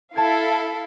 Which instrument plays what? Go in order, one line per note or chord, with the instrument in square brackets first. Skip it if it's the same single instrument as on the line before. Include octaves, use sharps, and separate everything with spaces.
[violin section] E4 A4 F5 [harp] A5 G#6